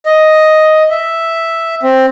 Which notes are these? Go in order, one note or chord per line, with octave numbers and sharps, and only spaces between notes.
D#5
E5
C4